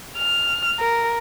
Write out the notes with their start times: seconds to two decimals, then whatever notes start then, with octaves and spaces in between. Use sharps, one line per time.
0.18 F6
0.80 A#4